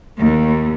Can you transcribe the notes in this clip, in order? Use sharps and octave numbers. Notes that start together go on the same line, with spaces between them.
D#2